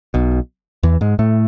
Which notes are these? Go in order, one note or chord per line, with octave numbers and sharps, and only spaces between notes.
B1 B2
E2 E3
G#2 G#3
A2 A3